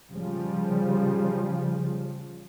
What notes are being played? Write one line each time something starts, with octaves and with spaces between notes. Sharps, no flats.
C#3 F3 G3